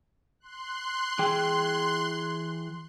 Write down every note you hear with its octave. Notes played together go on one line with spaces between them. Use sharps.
C6 F#6
E3 G#4 G5